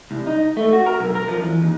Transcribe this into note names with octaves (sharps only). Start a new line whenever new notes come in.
C2
D#4
A3
F#4
A#4
B1
A#4
F3
E2
D#2